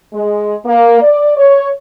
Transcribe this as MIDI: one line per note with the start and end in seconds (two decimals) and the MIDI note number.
0.14 0.55 56
0.66 1.01 58
1.02 1.35 74
1.37 1.69 73